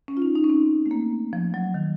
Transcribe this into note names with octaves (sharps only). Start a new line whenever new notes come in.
C#4
F4
D#4
D#4
C#4
C4
A3
A#3
F3
F#3
D#3